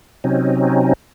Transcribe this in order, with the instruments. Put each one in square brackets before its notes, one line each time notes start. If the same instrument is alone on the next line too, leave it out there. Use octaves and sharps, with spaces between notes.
[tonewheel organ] C3 F#3 C4 C#4 D#4